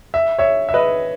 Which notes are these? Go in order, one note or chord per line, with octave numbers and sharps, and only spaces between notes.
E5
C#5 E5
E5
B4 D#5